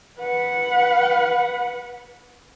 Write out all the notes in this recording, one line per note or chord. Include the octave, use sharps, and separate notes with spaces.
B4 F#5